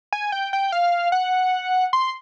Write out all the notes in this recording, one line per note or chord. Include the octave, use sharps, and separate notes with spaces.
G#5
G5
G5
F5
F#5
C6